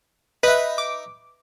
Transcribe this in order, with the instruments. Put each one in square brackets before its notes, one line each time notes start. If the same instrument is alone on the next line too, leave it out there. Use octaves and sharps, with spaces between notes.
[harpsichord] D#4 E5 [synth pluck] B4
[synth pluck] D6